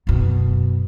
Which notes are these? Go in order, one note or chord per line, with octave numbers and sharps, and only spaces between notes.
F#2 B2